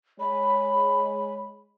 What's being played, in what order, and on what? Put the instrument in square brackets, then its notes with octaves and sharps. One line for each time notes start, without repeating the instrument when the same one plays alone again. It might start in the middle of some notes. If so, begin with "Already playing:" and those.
[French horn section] G#3 C#5 [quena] B5